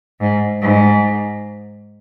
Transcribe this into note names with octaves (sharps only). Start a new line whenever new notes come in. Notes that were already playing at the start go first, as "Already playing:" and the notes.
G#2
G#2